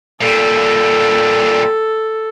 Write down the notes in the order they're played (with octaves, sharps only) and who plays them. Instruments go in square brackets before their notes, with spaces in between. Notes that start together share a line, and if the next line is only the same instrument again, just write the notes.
[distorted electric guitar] A#2 G3 [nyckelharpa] A4